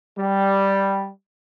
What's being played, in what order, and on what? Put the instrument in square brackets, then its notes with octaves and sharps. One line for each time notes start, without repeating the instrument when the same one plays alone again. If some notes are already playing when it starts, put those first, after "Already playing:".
[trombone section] G3